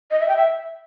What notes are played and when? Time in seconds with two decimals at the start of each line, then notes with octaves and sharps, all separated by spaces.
0.11 D#5
0.20 E5
0.28 G5
0.37 E5